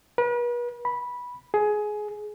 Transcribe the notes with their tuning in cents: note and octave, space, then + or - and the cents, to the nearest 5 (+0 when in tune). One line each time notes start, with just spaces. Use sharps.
B4 -40
B5 -10
G#4 +15